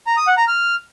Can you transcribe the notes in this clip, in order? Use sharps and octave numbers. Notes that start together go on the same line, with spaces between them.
A#5
D#6
F#5
A#5
F6